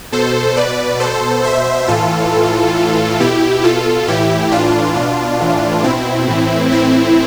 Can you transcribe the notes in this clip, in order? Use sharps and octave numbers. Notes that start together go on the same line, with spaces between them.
B2 A4 C5
B2 B4 D5
B2 A4 C5
B2 C5 E5
A2 E3 F4 A4
A2 E3
A2 E3
B2 E4 G4
B2 F4 A4
A2 E3 E4 G4
A2 E3 D4 F4
B2 D4 F4
A2 E3
B2 C4 E4
A2 E3
A2 E3 C4 E4